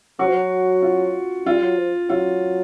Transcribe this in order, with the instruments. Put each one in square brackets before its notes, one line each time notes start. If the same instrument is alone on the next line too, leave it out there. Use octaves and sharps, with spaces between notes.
[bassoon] F#3 [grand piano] F#4
[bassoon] F3
F#3
[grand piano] F4
[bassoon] G3 [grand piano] F4
[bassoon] F#3
F3
[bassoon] F#3 [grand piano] F4